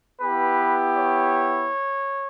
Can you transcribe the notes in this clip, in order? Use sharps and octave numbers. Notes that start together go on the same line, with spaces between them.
B3 E4 G4 B4
C#5